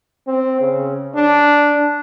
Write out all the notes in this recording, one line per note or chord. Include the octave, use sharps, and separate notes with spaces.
C4
C#3
D4